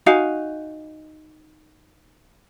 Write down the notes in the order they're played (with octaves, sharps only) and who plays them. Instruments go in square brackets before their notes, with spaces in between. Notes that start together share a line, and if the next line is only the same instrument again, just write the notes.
[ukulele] D#4 F#4 F5 G#5